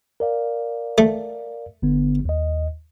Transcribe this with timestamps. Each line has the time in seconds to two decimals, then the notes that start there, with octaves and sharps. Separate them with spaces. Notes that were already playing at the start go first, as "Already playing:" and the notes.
0.20 A#4 D5 F5
0.98 A3
1.83 G1 D3 B3
2.25 D#2 D#5